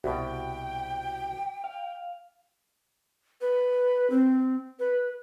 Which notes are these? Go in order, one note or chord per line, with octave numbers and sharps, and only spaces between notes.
C2 B2 F#4 G5
F5
B4
C4
B4